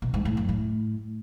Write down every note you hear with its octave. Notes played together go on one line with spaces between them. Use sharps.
B2
G#2
A2
F#2
A2